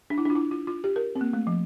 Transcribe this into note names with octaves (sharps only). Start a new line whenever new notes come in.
D4
E4
D4
F4
E4
F4
F4
G4
A#4
C4
A#3
A3
F3